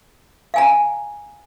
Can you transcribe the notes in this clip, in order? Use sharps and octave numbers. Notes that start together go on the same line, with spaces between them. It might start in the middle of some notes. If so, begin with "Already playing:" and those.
F5 G#5 A#5